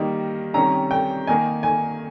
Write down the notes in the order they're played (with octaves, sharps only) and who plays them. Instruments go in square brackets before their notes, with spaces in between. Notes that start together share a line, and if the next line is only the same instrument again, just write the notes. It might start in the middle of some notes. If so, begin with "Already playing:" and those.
Already playing: [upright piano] D#3 G3 A#3 D#4
C3 D#3 G3 C#4 A#5
G5
D#3 A#3 D#4 G#5
G#5